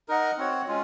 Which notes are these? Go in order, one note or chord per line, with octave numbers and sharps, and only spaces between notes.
D#4 A#4 D#5 F#5
C4 F#4 C#5 F#5
G#3 C#4 F4